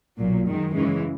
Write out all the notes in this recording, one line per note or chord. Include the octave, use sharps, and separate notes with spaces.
B1 A#2 F#3
F#2 D#3 G#3
F#2 C#3 E3 G#3